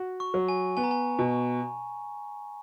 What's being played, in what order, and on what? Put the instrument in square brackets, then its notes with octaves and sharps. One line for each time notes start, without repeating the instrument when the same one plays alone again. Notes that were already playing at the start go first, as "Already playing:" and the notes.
Already playing: [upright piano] F#4
[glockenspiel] C#6
[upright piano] F#3
[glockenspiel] G#5
[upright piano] B3 [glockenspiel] G#5
[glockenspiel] A#5
G#5
[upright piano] B2